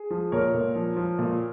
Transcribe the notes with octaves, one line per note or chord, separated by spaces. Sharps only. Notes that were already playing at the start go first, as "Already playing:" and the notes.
Already playing: G#4
F3
A#2 A#4 C#5
A#2
F3
F3
A#2